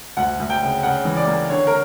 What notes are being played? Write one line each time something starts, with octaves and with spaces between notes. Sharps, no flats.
D2 F#5
D2
G5
C#3
C#3 F#5
E3
D5
A#3
D3 C#5
A#4